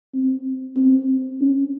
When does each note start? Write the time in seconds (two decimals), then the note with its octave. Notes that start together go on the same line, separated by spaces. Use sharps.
0.14 C4
0.76 C4
1.41 C#4